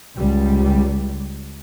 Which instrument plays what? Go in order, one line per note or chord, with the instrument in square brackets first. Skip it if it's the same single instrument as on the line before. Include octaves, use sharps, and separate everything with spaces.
[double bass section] C#2 G3